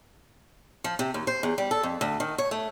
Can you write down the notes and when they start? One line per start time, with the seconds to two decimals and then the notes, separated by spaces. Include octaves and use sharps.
0.84 F3
0.99 C3
1.14 D#2
1.27 C5
1.43 E2
1.58 G3
1.71 A4
1.83 F2
2.01 D2
2.20 D#3
2.38 C#5
2.51 A3